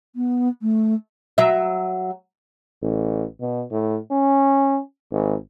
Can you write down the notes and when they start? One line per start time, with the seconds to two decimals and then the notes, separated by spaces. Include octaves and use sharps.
0.16 B3
0.62 A3
1.38 F#3 E5
2.82 A1
3.41 B2
3.71 A2
4.11 C#4
5.12 G#1